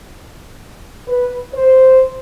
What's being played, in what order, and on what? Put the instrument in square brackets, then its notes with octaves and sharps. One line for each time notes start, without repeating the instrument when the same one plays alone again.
[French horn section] B4
C5